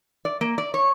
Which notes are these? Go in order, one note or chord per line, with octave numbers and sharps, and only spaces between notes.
D5
A#3
D5
C#5